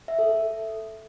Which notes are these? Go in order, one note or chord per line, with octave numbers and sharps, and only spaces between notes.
E5
A4
A4